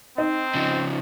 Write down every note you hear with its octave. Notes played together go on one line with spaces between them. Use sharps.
C4 D#4
C#3 F3